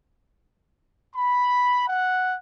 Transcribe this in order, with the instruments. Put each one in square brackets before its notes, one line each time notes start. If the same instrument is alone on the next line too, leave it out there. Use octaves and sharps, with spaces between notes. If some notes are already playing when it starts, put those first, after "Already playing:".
[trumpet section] B5
F#5